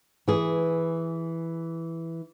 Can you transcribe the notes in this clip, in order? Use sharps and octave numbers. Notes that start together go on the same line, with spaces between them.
E3 G#4